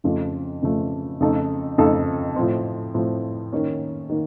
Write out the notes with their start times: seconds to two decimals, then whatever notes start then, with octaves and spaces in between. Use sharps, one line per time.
0.04 F2 C#3 F3 A3
0.62 F2 C#3 F3 A3
1.20 F2 C#3 A3 D#4 A4
1.78 F2 C#3 A3 D#4 A4
2.36 A2 F3 C4
2.94 A2 F3 C4
3.52 D#3 A#3 C#4
4.09 D#3 A#3